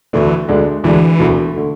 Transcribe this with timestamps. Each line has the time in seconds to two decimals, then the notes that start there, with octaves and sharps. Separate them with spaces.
0.13 D2 D3 E3 A3 D4
0.48 D2 D3 G#3 D4
0.84 D2 D3 E3 G#3 D4
1.19 E1 D2 D3 A3
1.56 D3 A3